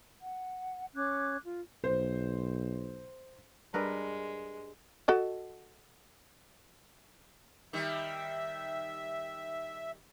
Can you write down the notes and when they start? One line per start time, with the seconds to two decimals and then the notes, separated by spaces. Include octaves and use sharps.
0.21 F#5
0.95 C#4 D6 F#6 G#6
1.44 F4
1.84 B1 C5
3.74 G2 G#3 A#4 B4
5.08 F#4 A4 D#5
7.73 D#3 G3 E5